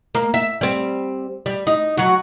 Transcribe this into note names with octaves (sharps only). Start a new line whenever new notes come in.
A#3
E5
G3 C4
G3
D#4
F#3 F#4